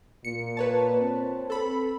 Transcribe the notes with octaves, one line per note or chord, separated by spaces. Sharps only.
A#2 C#7
B4 C#5 A5
C4
A4 B5